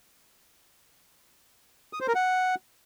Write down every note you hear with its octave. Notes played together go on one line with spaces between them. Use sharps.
D#6
C5
A#4
F#5